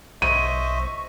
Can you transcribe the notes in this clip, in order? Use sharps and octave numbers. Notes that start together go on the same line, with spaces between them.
B1 C5 D#5 E5 C#6 D#7